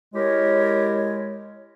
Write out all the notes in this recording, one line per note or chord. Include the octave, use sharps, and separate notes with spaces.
G#3 E4 G4 A#4 C#5